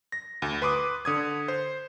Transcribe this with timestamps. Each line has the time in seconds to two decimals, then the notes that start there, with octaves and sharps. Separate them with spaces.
0.12 A#6
0.42 D2
0.62 B4 C6 D6 D#6
1.05 D3 D#6 G#6
1.48 C5